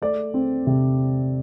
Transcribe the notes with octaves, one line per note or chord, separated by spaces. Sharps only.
A3 D5
C4
C3